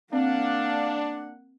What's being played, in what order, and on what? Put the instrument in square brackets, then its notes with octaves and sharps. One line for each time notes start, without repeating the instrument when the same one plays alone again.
[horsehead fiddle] A#3 F#5 [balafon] C4 [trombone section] D4 [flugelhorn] F5